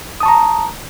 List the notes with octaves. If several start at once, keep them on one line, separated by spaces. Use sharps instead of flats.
A5 A#5 C#6 D#6